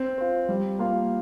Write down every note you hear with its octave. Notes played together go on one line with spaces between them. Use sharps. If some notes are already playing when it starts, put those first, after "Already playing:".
Already playing: C4
F4 C5
G3
A#3 F4